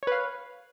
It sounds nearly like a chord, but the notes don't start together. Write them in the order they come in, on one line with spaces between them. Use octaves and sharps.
C#5 B4 F5